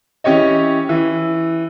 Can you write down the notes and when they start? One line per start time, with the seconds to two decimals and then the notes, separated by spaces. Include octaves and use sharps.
0.24 E3 C#4 G4 C#5 D#5
0.89 E3